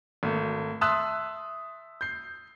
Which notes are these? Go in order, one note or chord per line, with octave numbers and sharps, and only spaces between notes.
G#1 A3
E5 A5 C6 D#6 E6 F#6
G6 C7